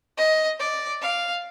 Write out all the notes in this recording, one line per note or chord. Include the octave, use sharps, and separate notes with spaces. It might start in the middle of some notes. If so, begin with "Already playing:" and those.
D#5
D5
F5